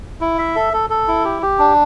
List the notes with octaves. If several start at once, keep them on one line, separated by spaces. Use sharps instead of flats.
E4
E5
A4
A4
A4
E4
G4
G4
D4